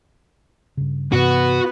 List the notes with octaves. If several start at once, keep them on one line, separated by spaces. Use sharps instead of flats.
G2 C#3
G2 C3 E3 B3 F#4 B4